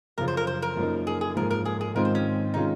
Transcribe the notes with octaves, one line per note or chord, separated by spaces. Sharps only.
F#2 C#3 F3 A#4
C5
A#4
C5
A#4
F#2 F3 A#3 D#4
G#4
G#4
G#2 F3 A#3 A#4
A#4
G#4
G#4
G#2 D#3 G#3 C4 F4 A#4
C5
C#4
D#3 G#3 C#4 D#4 F4